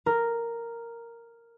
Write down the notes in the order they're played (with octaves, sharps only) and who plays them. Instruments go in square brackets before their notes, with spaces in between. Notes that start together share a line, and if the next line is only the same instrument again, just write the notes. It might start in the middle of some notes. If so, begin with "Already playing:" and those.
[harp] A#4